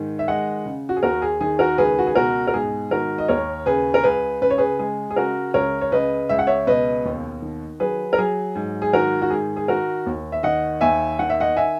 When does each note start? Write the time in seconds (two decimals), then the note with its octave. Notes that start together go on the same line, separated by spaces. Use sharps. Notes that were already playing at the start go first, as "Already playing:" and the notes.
Already playing: G#2 D#3
0.19 E5
0.28 G#3 D#5 F#5
0.65 C#3
0.89 F#4
0.97 G#4
1.03 D#2 F#4 A#4
1.22 G#4
1.41 D#3 G#4
1.59 F#4 A#4
1.78 C#2 G#4 B4
1.99 F#4
2.07 G#4
2.15 B2 F#4 A#4
2.47 A#4
2.54 G#2 G#4
2.91 D#3 F#4 A#4
3.18 D#5
3.28 D#2 A#4 C#5
3.66 C#3 G#4 B4
3.94 A#4
4.04 C#2 G#4 B4
4.42 C#3 B4
4.50 C#5
4.58 G#4 B4
4.79 G#3 G#4
5.11 G#4
5.16 C#3 F#4 A#4
5.54 C#2 A#4 C#5
5.81 C#5
5.92 C#3 B4 D#5
6.29 C#2 E5
6.39 F#5
6.47 C#5 E5
6.67 B2 B4 D#5
7.05 D#2
7.42 D#3
7.80 F#3 G#4 B4
8.13 A#4
8.18 F#3 G#4
8.55 G#2
8.82 G#4
8.93 D#3 F#4 A#4
9.22 F#4
9.30 G#2 G#4
9.56 G#4
9.68 D#3 F#4 A#4
10.06 D#2
10.32 E5
10.43 D#3 D#5 F#5
10.81 D#2 E5 G#5
11.19 D#3 F#5
11.30 E5
11.40 D#5 F#5
11.56 E5 G#5